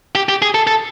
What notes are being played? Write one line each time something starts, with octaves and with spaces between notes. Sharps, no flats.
G4
G4
G#4
A4
A4